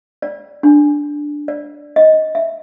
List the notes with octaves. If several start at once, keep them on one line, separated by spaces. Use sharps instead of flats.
D5
D4
D5
D#5
E5